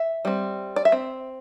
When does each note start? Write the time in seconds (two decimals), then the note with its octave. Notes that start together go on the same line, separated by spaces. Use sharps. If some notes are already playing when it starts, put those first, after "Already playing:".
Already playing: E5
0.25 G3 C4
0.76 D5
0.85 E5
0.92 C4